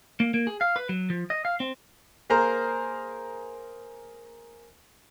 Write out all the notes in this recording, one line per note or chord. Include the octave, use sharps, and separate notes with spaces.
A#3
A#3
G#4
F5
B4
F#3
F3
D#5
F5
C4
A#3 G#4 A#4 C5 A#5